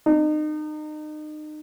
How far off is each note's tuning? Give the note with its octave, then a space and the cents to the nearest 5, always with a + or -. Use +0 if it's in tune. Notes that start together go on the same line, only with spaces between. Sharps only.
D#4 -35